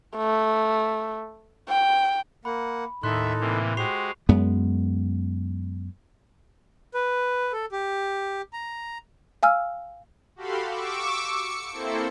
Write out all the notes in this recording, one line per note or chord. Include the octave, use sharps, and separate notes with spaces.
A3
G5
A#3 F#5 B5
D#2 A2 D#4 A4 E5 C6 F#6
C3 E3 A#3
G#3 F#4 G4 C5 C#6 C7 F7
F#2 G#3 B3
B4
A4
G4
A#5
F5 G#5 E6 F6
F#4 G4 A4 F5 B5 C6
C#6 D6 E6
C#7
A#3 C4 E4 A4 C5